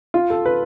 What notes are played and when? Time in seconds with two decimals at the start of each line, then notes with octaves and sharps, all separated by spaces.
0.14 F4
0.30 A4
0.46 B4